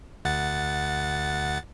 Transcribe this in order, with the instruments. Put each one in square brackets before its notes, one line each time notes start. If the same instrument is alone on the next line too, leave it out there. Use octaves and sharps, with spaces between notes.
[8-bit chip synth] D2 F#5 A6